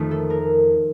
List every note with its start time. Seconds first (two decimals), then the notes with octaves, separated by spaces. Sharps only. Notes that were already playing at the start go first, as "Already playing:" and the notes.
Already playing: F2 D#3 A3 D#4
0.11 A4
0.30 A#4